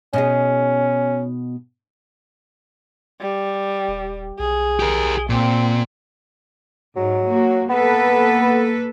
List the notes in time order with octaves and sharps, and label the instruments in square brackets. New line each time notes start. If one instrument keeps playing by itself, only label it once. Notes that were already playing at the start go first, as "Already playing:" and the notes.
[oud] B2 D#4 G#4 [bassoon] C#4
[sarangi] G3
[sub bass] D#1
[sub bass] B1 [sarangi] G#4
[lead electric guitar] G4 A#4
[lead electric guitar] A#2 [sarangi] C4
[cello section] G#2 [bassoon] F#3
[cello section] A#3 F#4
[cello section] A#3 A4 B4 [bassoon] B3